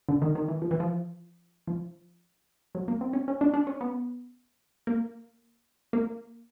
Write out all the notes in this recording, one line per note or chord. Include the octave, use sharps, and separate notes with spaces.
D3
D#3
D#3
E3
F3
E3
F3
F3
F#3
A#3
C4
C#4
C#4
D4
D4
C#4
B3
A#3
A#3